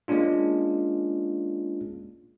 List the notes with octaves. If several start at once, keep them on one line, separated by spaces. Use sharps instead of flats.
G#3 A#3 C#4 D4 F4